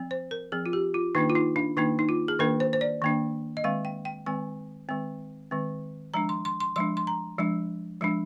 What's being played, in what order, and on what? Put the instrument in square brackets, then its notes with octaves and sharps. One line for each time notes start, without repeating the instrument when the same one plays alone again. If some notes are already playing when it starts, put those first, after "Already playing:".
Already playing: [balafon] F3 C4
C5
A#4
F3 C4 G#4
F4
G4
F4
D#3 A#3 D4 D#4
F4
D#4
D4
D#3 A#3 D4 D#4
D#4
F4
G#4
D#3 A#3 D4 A#4
C5
C5
D5
D#3 A#3 D4
D#5
D#3 G#3 C4 F5
G5
G5
D#3 G#3 C4 G#5
D#3 G#3 C4
D#3 G#3 C4
F3 G#3 D4 A#5
C6
C6
C6
F3 G#3 D4 C6
C6
A#5
F3 G#3 D4
F3 G#3 D4